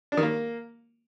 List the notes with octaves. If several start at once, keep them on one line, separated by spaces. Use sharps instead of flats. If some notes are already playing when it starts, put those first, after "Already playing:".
D4
D#3
A#3